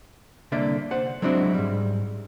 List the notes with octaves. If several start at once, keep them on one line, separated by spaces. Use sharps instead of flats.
C2 D3 A#3 D5 E5
C5 F#5
F#3 G#3 C4 D4 E4 F#4
G#2 G3